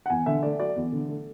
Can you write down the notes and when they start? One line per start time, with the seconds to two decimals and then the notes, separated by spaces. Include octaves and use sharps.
0.06 F#5
0.10 E2 G#5
0.26 D3 E5
0.43 A3 D5
0.59 F#3 D5
0.76 E2
0.92 D3
1.09 A3